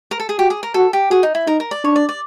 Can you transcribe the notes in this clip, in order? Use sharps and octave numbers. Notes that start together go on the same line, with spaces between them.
A#4
A4
G#4
F#4 G4
G#4
A#4
F#4 A4
G4
F#4 G#4
D#4
E4
D#4 A#4
A#4
D5
D4 C#5
D5
D5